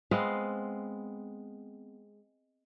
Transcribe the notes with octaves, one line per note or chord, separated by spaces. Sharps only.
G#3 B3 C4 F5